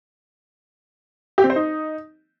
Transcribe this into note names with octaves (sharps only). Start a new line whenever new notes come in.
G4
C4
C5
D#4